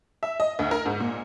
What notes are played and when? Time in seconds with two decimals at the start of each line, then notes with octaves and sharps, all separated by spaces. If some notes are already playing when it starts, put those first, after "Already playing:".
0.23 E5
0.40 D#5
0.59 D2
0.71 A#4
0.86 G#2
1.00 A#2